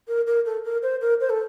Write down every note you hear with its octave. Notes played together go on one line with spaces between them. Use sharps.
A#4
A#4
A4
A#4
C5
A#4
C5
A4